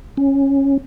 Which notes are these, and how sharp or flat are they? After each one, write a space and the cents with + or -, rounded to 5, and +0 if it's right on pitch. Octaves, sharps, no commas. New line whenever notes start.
C#4 -10